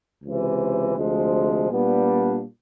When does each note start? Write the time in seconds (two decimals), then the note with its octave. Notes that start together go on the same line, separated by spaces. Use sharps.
0.23 C#2 C3 E3
0.96 D2 C3 F3 G#3
1.69 A#2 G3 B3 D4